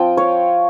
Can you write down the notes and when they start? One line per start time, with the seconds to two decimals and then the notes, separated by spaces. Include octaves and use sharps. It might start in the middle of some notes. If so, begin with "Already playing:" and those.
Already playing: F3 C4 F4 G5
0.17 C#5 F5